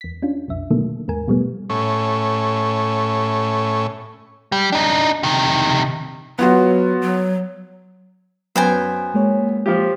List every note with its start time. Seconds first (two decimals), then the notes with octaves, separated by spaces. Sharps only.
0.01 E2 B6
0.22 C#4 D4 F4
0.48 B1 F2 E5
0.70 B2 D3 D#3 F#3 A3 A#3
1.08 D#2 G#2 A#4 G#5
1.28 B2 F3 G3 A3 B3
1.70 A2 C#4
4.52 G3
4.72 D4 D#4
5.23 C3 D#3
6.39 F#3 B3 F4 F#4
7.02 F#3
8.56 F#2 B3 C5 G5 G#5
9.14 G#3 A#3 C#5
9.66 F3 F4 G4